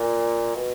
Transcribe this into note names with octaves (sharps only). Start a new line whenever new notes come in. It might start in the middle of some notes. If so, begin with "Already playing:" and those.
Already playing: A#2
B2